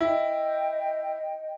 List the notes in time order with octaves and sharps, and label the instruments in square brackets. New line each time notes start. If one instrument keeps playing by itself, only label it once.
[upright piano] E4 [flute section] D#5 G5